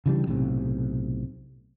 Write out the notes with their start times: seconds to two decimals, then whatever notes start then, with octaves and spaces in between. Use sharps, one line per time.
0.06 C#3 E3 G3 D4
0.27 B1 A2 C3